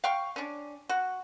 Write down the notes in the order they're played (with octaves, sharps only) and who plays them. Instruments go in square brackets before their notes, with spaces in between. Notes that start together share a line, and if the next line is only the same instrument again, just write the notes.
[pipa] F5 G5 C#6
C#4 D4
F#4